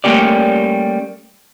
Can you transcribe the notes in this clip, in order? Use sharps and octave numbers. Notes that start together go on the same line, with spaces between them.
G3 A3 A#3 C#4 G4 D5